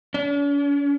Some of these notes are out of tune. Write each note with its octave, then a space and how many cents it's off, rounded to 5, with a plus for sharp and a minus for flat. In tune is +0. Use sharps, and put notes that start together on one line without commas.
C#4 +45